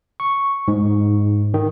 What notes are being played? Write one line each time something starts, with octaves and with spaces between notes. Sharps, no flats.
C#6
G#2
D#3